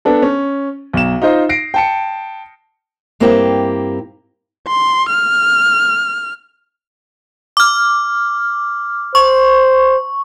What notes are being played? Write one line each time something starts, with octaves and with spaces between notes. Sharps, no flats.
B3 D4 A4
C#4
B1 E7
D#4 F4 C5 D#5
A#6 C7 D7
G5 A5 C#7
G2 A#3 C4 E4 G4
C6
F6
D6 F6
C5 C#6